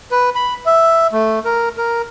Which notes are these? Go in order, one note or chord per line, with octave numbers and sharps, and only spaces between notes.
B4
B5
E5
A3
A#4
A#4